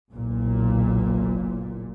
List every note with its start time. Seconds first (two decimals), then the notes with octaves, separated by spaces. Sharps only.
0.12 F#1 B1 A#2